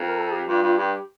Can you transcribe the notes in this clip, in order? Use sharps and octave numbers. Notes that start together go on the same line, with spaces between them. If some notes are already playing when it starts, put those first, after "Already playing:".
Already playing: F2
A#4
A4
G4
G2 F4
G2 F4
G2 G4